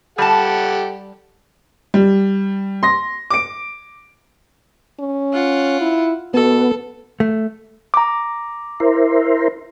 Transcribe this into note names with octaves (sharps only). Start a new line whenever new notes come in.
G3 G4 A4 F#5 A5
G3
C6 A#6
D6 D7
C#4
F4 F#5
E4
B2 B3 A4
A3
A#5 D6
E4 A#4 C5